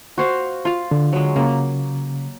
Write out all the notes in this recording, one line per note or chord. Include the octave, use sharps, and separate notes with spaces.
F#4 C5 F5
F4 F5
D3
F#3 G#3
C#3 A#3